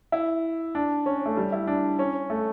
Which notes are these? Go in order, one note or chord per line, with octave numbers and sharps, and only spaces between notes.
E4
D4
C#4
A3
G3
E4
D4
C#4
A3